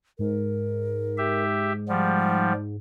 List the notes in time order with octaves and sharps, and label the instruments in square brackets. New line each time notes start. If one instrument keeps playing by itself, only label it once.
[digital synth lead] G#2 [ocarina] A#4
[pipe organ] G4 E5
[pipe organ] F3 G3 [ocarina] F#5